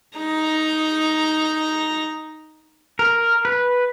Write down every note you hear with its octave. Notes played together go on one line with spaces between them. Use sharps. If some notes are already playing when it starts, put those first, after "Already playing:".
D#4 A#5
A#4
B4